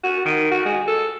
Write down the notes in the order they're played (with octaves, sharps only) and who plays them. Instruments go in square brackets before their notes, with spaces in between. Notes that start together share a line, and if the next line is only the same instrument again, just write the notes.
[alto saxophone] F#4
D#3
F#4
G#3
A4